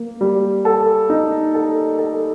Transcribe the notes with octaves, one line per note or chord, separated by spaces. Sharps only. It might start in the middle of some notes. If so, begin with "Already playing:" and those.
Already playing: A#3
G3
A4
D#4
A4
A4